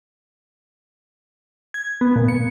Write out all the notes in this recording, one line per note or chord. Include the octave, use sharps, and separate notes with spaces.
G#6
B3
A#2
C#7